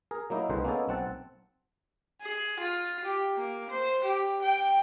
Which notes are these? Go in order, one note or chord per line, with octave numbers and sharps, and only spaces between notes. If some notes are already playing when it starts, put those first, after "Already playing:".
G#4 A#4
F#3 A#3 D#4 E4
C2 D3 G#3 B4 C5
A#3 B3 C#4 D#4 G#4 A4
B1 C4 F#5 A5
G#4
F4
G4
A#3
C5
G4
G5